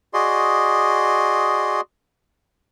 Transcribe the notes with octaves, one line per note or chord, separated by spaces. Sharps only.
F#4 G#4 D5 D#5 C6